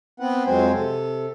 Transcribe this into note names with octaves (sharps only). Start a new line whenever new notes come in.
B3 C4 B4 F#5
F2 F#3 G#3 C4 C5 G#5
C3 A4